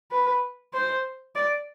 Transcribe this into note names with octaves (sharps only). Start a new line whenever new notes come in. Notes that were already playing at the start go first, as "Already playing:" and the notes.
B4
C5
D5